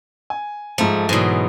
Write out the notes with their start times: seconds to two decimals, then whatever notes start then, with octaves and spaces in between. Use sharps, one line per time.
0.30 G#5
0.78 G#2 F3 A3
1.09 G#2 B2 E3 F#3